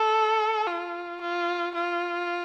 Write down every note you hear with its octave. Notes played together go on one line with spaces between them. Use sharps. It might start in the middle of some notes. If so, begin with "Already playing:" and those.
Already playing: A4
F4
F4
F4